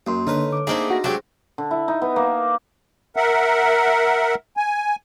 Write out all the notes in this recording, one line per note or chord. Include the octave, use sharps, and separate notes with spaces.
F#2 A#3 C6
D3 D#4 A4 B4 C#5 F6
D6
A3 A#3 C4 D4 D#4 G#4
F#4 C5 A#6
F#3 G#3 A3 D4 G4
D3
E4
D#4
B3
A#3
A#4 E5 F#5
G#5